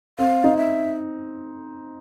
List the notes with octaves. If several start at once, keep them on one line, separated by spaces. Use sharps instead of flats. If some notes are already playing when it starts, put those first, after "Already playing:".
C4 F5
D#4
E5